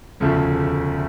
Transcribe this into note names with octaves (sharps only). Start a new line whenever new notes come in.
E1 D2 C#3 F3 A3